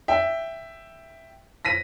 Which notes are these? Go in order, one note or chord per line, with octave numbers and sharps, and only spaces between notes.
E5 G5
A#6 B6 D#7